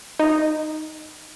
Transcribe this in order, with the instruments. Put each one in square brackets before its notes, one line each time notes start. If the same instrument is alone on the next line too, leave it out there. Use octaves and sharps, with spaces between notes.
[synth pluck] D#4